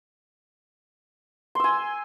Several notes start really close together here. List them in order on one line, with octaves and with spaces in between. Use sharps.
C6 E6 G#5